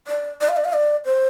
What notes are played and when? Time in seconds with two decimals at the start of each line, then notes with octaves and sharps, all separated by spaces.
0.07 D5
0.41 D5
0.49 F5
0.57 D5
0.65 F5
0.73 D5
1.05 C5